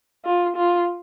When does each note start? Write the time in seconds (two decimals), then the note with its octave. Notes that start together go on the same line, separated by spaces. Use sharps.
0.25 F4
0.56 F4